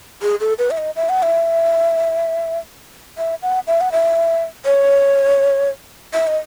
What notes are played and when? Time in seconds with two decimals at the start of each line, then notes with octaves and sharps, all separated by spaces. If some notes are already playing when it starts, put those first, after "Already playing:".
0.22 G#4
0.41 A4
0.59 B4
0.71 E5
0.78 D#5
0.96 E5
1.09 F#5
1.23 E5
3.18 E5
3.43 F#5
3.67 E5
3.81 F#5
3.92 E5
4.66 C#5
6.14 E5
6.27 D#5